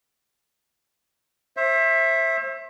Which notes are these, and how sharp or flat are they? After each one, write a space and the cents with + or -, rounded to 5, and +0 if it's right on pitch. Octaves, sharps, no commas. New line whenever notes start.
C5 +40 E5 +0